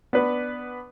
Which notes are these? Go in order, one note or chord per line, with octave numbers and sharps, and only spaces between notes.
B3 D4 B4